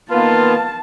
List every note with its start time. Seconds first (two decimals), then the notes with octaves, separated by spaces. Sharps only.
0.11 D#3 A#3 B3 F4 B4 A5